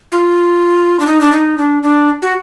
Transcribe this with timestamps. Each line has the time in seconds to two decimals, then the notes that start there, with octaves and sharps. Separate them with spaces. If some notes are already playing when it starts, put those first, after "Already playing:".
0.12 F4
1.00 D4
1.07 D#4
1.21 D4
1.32 D#4
1.58 D4
1.83 D4
2.22 F#4